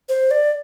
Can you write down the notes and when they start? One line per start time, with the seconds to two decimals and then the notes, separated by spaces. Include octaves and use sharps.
0.09 C5
0.31 D5